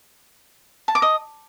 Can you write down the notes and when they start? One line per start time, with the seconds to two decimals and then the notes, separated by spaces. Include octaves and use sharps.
0.88 A5
0.95 D6
1.02 D#5